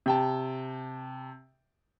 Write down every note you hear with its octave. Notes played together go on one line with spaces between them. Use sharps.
C3 G5 A5